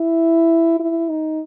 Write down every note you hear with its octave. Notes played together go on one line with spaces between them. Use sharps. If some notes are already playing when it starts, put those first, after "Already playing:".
Already playing: E4
E4
D#4